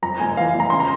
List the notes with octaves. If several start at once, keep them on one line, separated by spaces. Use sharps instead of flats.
F2 A#5
F1 G#5
E3 F5
F1
A#5
C#3 C6
A#5